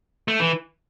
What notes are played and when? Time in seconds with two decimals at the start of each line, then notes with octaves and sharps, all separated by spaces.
0.28 A3
0.40 E3